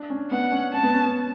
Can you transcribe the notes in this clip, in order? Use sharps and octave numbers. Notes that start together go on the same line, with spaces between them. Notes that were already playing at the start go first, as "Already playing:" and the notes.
Already playing: D4
C#4
B3 F#5
C#4
C#4 A5
B3
C#4
B3